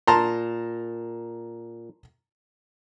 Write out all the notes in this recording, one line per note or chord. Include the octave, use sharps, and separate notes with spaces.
A#2 A5 A#5 C6